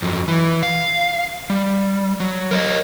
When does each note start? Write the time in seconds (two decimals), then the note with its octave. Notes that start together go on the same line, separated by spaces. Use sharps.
0.02 F2 F#3
0.28 E3
0.63 F5
1.50 G3
2.20 F#3
2.51 A#4 C#5 D#5